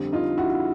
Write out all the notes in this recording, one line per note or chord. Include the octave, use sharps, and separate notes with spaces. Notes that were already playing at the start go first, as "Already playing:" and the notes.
Already playing: F2 D3 G3
D#4 F4
E4 F#4